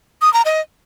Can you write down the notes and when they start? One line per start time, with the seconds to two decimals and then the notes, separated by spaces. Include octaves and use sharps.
0.22 D#6
0.33 A#5
0.45 D#5